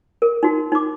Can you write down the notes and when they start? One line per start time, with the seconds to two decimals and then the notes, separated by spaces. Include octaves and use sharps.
0.22 A#4
0.43 D#4 F#4
0.72 D#4 D6